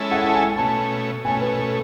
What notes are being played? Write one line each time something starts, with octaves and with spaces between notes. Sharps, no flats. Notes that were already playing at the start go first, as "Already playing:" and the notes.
Already playing: G#3 C#4 E4 A4
F#5
A5
G#5
B2 A3 C#4 A5
B2 A3 C#4 G#5
B4
A4